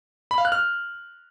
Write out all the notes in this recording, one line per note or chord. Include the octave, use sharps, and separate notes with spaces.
B5
F5
F#6
F6